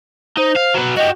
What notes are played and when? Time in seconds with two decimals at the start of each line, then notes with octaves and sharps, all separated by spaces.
0.37 D#4 C5
0.56 F5
0.74 F#3 B4
0.97 F#4 G4 D#5